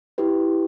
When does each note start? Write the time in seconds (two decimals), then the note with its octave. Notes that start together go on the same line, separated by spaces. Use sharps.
0.18 E4 G4 B4